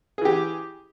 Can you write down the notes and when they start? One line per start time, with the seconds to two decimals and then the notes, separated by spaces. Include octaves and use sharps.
0.18 G#4
0.22 E3
0.25 G4